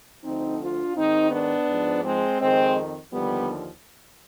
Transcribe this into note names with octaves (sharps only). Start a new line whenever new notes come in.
D2 D3 F3 C4 D#4
D4 F4
G#2 D#3 C4 D#4
B3 D4
G#2 F3
G#3 C4
F2 D#3 G#3 C4
D#2 D3 F3 G3 B3